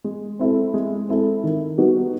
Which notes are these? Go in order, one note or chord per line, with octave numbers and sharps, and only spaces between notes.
G#3
C4 E4 A4
G#3
C4 E4 A4
D#3
G3 B3 D#4 F#4